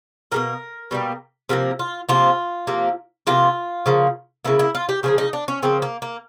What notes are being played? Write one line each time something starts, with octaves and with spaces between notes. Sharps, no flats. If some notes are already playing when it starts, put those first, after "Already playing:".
B2 G3 A#3 A#4
B2 G3 A#3
C3 F3 A#3 A#4
F4
C3 F3 A#3 F4
C3 F3 A#3
C3 F3 A#3 F4
C#3 F3 A#3
C#3 F3 A#3 E4
E4
F4
G4
C#3 F3 A#3 G#4
D#4
D4
C#4
C#3 F3 A#3 C4
A#3
A#3